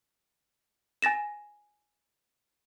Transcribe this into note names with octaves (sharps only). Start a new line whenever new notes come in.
G#5 A6 A#6 E7